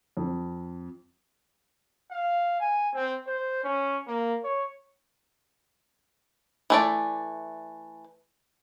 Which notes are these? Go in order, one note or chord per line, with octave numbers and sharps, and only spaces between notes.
F2
F5
G#5
C4
C5
C#4
A#3
C#5
E3 A3 D5